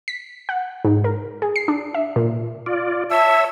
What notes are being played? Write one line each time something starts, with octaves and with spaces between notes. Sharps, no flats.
B6
F#5
G#2
A#4
G#4
C7
D4
E5
A#2
F4 D5
C#5 E5 A5 E6